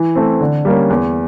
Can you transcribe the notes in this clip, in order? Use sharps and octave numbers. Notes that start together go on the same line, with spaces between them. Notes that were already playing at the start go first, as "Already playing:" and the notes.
Already playing: E3
A3 C4
D3
G3 A#3 C#4
E2